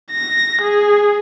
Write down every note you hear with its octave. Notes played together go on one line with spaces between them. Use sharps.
A#6
G#4